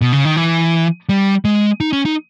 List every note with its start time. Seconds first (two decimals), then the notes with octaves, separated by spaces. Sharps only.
0.01 B2
0.12 C#3
0.25 D#3
0.36 E3
1.09 G3
1.45 G#3
1.80 D#4
1.93 C#4
2.05 D#4